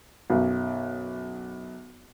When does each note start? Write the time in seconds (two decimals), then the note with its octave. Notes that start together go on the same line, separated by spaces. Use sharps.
0.30 B1 F#2